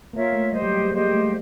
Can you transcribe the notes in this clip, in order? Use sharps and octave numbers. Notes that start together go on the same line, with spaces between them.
A#3 F4 A#4 C#5 E5
A3
G3 G4 C5 D#5
F#3
G3
G#3
A#3 G4 C5 D#5
A3
G3